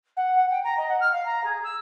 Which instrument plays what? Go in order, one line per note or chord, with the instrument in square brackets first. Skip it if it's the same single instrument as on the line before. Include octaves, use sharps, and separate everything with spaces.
[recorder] F#5
F#5
G5
A#5
D#5
F#5
F6
F5
A#5
G#4
E6